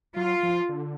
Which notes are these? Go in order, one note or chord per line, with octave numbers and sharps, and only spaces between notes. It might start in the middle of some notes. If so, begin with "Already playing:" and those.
F#3 F4
F3
D3